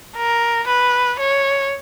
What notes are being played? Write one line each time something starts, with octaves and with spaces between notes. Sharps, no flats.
A#4
B4
C#5